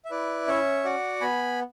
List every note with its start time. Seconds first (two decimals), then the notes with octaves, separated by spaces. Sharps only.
0.05 E5
0.11 E4 B4 D5
0.47 C#4 C#5 E5
0.84 F#4 D5 F#5
1.21 B3 G#5 B5